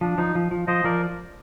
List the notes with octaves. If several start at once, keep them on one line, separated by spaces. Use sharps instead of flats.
F3 D4
F3 D#4
F3
F3
F3 C5 D#5
F3 A#4 D5